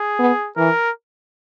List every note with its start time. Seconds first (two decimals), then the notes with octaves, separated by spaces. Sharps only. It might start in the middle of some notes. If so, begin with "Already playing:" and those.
Already playing: G#4
0.19 B3
0.57 E3 A#4